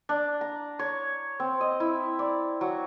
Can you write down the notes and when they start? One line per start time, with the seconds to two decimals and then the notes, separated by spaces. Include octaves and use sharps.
0.09 D4
0.41 A#5
0.79 C#5
1.40 C4
1.61 D#5
1.80 E4
2.19 D5
2.61 F#3